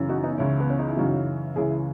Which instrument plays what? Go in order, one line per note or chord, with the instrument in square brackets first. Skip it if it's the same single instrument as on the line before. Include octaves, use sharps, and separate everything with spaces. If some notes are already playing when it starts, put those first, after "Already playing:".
Already playing: [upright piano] F#2 C#3 E3
D#4 F#4
B3 D#4
C#2 C#3 E3 C#4 E4
B3
C#4
D#4
E4
F#2 C#3 E3 D#4 F#4
C#2 C#3 E3 E4 G#4